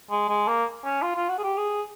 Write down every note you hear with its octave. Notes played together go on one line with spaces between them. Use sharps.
G#3
G#3
A#3
C#4
F4
F4
F#4
G#4
G4
G#4